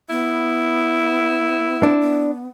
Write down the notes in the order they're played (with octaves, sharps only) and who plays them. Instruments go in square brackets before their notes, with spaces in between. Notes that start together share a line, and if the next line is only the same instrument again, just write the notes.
[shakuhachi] B3 [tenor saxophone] E4
[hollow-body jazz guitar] D4
[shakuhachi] B3